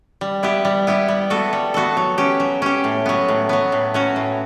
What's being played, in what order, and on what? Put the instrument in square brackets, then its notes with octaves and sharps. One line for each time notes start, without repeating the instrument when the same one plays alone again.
[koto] G3
B3 E4 G4
G3
B3 E4 G4
G3
B3 F#4 A4
G3
B3 F#4 A4
F#3
C#4 G4
F#3
C#4 G4
A2
F#3 B3
A2
F#3 B3
A2
F#3 C#4 F#4
A2